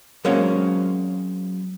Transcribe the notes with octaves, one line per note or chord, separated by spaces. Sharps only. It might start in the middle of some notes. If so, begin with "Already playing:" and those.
F#3 G#3 A#3 C4 C#4 F5